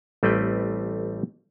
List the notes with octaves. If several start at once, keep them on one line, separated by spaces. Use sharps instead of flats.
A1 G3 A3 C4 B4 G5